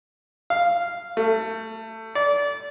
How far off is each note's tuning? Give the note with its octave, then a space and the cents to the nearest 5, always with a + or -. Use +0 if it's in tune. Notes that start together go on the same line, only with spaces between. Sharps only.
F5 -10
A3 +20
D5 -25